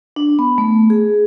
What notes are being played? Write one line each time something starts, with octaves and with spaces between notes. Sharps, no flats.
D4
B3
A3
G#4